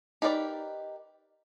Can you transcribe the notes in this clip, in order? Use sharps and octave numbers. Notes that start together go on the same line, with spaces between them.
D#4 G4 A#4 B4 D5